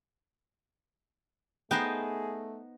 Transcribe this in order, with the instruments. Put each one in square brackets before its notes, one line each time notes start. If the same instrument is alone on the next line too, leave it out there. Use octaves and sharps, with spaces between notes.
[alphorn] A3 [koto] B3 D#4 C5 [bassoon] G#4 [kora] G5